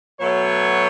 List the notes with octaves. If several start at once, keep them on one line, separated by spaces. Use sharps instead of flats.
B2 F#3 A3 C#5